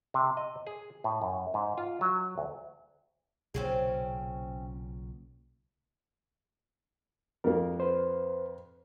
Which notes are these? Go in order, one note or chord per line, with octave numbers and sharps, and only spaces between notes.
C3
D#5
G#4
A2
F#2
G#2
F4
F#3
D2
B1 A#2 C#3 C4 C#4 G#4
F2 A#3 A#4
B4 C5